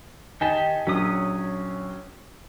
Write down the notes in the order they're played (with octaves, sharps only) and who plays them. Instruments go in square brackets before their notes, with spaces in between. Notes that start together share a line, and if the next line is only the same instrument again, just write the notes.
[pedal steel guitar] D#3 G4 A5 [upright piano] D#4 G#5
[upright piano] A#1 F#3 [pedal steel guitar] C#4 D#6